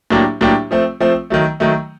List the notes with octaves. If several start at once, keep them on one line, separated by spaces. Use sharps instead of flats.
A2 F#3 A#3 D4 G4
A2 F#3 A#3 D4 G4
F3 A3 C4
F3 A3 C4
D#3 F#3 A3
D#3 F#3 A3